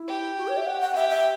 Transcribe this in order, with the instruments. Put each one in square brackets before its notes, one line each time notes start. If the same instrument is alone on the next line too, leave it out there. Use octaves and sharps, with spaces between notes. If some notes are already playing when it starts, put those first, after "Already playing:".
Already playing: [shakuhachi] E4
[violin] G4
[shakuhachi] F#4
C#5
E5
F#5
F#5
[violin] G4 [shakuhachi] E5
[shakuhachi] E5